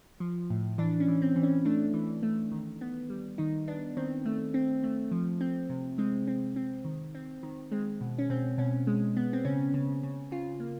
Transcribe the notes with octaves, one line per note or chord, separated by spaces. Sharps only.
F3
A2
E3 D4
C#4
E3
C4
E3
C#4
A3 D4
E3
A3
D#3
B3
G3
D#3 D#4
B3 D4
D#3 C4
A3
C4
A3
F3
C4
C3
G#3 C4
C4
C4
D#3
C4
D#3
G#3 C4
B2
C#4
B2 C4
B2 C#4
G#3
B3
C4
C#3 C#4
C#3
C#3
C#3 F4
A#3